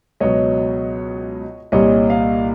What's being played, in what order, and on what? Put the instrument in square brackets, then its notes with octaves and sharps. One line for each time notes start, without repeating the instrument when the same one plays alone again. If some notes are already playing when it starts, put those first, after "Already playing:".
[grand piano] C#2 B2 F#3 C#5 D#5
C2 A#2 G3 C#5 D#5
D#5 F5